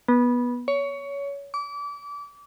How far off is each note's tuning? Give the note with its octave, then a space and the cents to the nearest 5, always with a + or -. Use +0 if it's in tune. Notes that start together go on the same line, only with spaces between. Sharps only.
B3 -15
C#5 +20
D6 -30